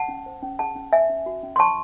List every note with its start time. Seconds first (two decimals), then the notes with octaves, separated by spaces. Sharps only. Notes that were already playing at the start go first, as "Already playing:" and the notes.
Already playing: F#5 A5
0.08 C#4
0.26 C5
0.42 C#4
0.59 G#4 F#5 A5
0.75 C#4
0.92 C5 E5 G#5
1.09 C#4
1.26 F#4
1.43 C#4
1.56 C6
1.59 C#5 A5 C#6